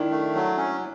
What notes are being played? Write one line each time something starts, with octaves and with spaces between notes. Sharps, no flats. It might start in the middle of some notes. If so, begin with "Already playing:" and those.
Already playing: D#3 D4 E4
A3
F#3
C#4